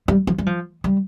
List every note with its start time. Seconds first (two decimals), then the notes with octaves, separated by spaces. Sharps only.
0.08 G3
0.27 F3
0.38 G3
0.46 F3
0.84 G3